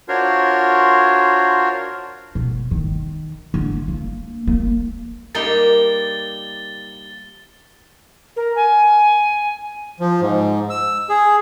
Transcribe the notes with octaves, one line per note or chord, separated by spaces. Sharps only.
D4 F4 F#4 A#4 C5 C#5
B2
D#3
D3
A#3
A#3
G3 A#3 D#4 A6 G7
A#4
G#5
F3
G#2
E6
G#4